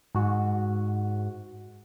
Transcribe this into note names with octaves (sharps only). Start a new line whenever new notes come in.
G#2 F#4